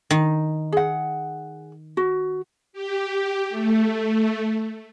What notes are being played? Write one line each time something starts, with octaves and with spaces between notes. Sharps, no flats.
D#3
G#4 F#5
F#4
G4
A3